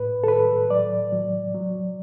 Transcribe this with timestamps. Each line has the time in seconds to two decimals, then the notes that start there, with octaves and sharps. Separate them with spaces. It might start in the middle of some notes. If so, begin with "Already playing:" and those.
Already playing: A2 B4
0.24 A4
0.28 A2 B4
0.70 F#3 D5
1.12 F#3
1.54 F#3